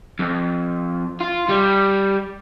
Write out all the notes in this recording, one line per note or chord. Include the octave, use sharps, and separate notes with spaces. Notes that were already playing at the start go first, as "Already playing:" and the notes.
F2
F4
G3